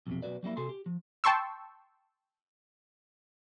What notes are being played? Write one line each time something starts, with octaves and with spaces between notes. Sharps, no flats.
B1 F2 C3
B1 C#3 F#4 B4 D5
F#3 G3 A#3 E4
C3 F#4 G#4 A4 C6
G4
F3
G5 A5 C6 C#6 E6